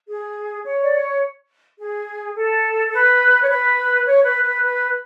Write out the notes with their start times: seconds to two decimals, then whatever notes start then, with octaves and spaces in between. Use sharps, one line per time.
0.08 G#4
0.65 C#5
0.83 D5
0.93 C#5
1.79 G#4
2.36 A4
2.89 A4
2.92 B4
3.43 C#5
3.49 B4
4.05 C#5
4.24 B4
4.43 B4
4.63 B4